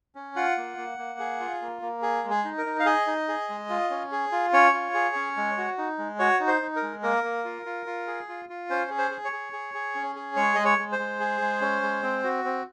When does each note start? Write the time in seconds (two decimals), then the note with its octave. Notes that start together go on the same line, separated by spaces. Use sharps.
0.15 C#4
0.36 F4 F#5
0.58 A#3
0.77 A#3
0.98 A#3
1.19 G#4
1.40 F4
1.62 A#3
1.82 A#3
2.02 G#4
2.24 G#3
2.30 G#4
2.44 D#4
2.58 A#4
2.66 D#4
2.79 F5
2.86 G#4 D#5
3.07 D#4
3.28 G#4
3.49 G#3
3.70 F4
3.90 C#4
4.12 G#4
4.32 F4
4.53 C#4 C#5
4.73 F4
4.94 G#4
5.16 C#4
5.37 G#3
5.58 F#4
5.78 D#4
5.98 G#3
6.19 F#4 C#5
6.40 D#4
6.47 C5
6.62 D#4
6.76 A#4
6.82 G#3
7.03 A#3 A#4
7.24 A#3
7.45 F4
7.66 F4
7.86 F4
8.07 G#4
8.29 F4
8.49 F4
8.70 C#4 C5
8.90 G#4
8.98 C5
9.11 G#4
9.25 C#5
9.32 G#4
9.53 G#4
9.74 G#4
9.95 C#4
10.15 G#4
10.36 G#3 C#5
10.55 G#3 D#5
10.65 C#5
10.78 G#3
10.92 C5
10.99 G#3
11.20 G#4
11.41 G#3
11.61 C#4
11.82 G#3
12.03 C4
12.24 F#4
12.44 C4